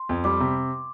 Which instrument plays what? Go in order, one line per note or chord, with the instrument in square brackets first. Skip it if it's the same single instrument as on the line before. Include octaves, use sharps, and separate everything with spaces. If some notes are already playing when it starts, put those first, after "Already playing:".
Already playing: [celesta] C6
[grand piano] F2
[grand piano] G3 [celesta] D6
[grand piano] C3